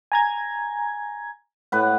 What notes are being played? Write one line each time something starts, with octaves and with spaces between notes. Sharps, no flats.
G#5 A#5 G#6
A2 B4 F#5